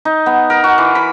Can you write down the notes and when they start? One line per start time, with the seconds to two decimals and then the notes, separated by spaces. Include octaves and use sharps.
0.05 D#4
0.26 B3
0.50 A#4
0.64 F#4
0.78 E3
0.95 B5